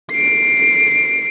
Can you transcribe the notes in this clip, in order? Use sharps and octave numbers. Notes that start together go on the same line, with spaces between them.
C7 D7